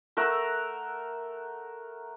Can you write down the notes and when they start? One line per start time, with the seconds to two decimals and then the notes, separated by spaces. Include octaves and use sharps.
0.17 A3 A#4 F#5 E6